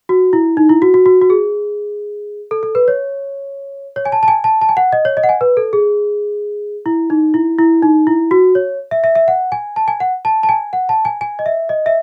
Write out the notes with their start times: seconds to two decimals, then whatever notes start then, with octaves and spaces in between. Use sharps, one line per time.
0.09 F#4
0.33 E4
0.57 D#4
0.69 E4
0.82 F#4
0.94 F#4
1.06 F#4
1.21 F#4
1.30 G#4
2.51 A4
2.63 A4
2.75 B4
2.88 C#5
3.96 C#5
4.05 G#5
4.12 A5
4.23 A5
4.28 G#5
4.44 A5
4.61 A5
4.69 G#5
4.77 F#5
4.93 D#5
5.05 C#5
5.17 D#5
5.23 F#5
5.29 G#5
5.41 B4
5.57 A4
5.73 G#4
6.86 E4
7.10 D#4
7.34 E4
7.59 E4
7.83 D#4
8.07 E4
8.31 F#4
8.55 C#5
8.91 E5
9.04 E5
9.15 E5
9.28 F#5
9.52 G#5
9.76 A5
9.88 G#5
10.00 F#5
10.25 A5
10.43 A5
10.49 G#5
10.73 F#5
10.89 A5
11.05 G#5
11.21 G#5
11.39 D#5
11.46 E5
11.69 D#5
11.86 E5